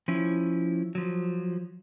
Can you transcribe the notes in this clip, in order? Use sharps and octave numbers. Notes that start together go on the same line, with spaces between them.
F3 C#4 E4
F3 F#3